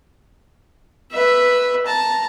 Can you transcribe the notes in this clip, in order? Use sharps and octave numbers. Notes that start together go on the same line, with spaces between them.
B4 E5
A5 A#5